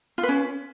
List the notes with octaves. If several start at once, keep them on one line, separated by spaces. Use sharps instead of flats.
F4
B4
C#4